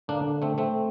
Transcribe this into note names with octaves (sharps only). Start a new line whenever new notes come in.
D3 A#3 D4
A3 C4
A3 C4